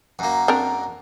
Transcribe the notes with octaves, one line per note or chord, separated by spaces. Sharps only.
F#2 A#3
C4 D4 A#4